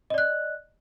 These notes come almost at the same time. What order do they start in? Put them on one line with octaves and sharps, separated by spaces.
D#5 D5 F#6